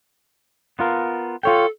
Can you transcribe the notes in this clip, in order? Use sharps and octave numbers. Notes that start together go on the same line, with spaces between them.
B3 F4 A#4
F4 A4 C#5 G5